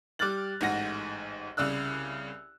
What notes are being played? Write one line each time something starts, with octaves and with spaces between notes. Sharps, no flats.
G3 D6 F6 F#6 A6 F#7
A1 G#2 F#5 A#6
C2 C#3 D5 E6 F#6